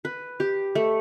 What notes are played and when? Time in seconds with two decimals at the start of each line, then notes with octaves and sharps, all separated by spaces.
0.05 B4
0.40 G4
0.75 A3